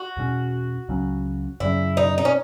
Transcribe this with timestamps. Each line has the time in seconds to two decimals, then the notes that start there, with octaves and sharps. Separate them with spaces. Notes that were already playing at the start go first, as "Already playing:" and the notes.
Already playing: F#4
0.17 E2 B2 A3 C#4
0.89 C#2 C#3 F#3 C#4
1.60 F#2 C#3 F#3 C#4 E4
1.97 D#4
2.18 D#4
2.25 C#4